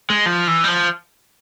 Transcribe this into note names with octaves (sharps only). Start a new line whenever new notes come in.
G#3
F3
E3
G3
F3